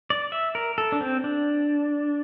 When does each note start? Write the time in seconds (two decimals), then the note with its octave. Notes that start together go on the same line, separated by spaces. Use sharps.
0.10 D5
0.32 E5
0.55 A#4
0.78 A4
0.92 D4
1.01 C4
1.24 D4